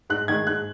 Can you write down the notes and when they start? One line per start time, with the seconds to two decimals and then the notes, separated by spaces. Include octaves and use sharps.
0.10 G#2 F#6
0.28 D#3 G#3 G#6
0.47 G#2 F#6